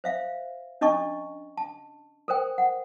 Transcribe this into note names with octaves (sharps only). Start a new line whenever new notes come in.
C5 E5 F5
C#4 D4 D#5 A5 C#6
A5
A4 A#4 C5 G5
F#5